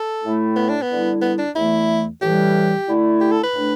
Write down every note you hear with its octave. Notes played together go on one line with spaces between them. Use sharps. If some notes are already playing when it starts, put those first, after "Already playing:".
Already playing: A4
A2 A3 E4
B3
D4
B3
D3 G3 E4
B3
D4
E2 E3 A3 E4
A2 E3 G3 G4
D3 A3 E4
G4
A4
B4
A2 A3 D4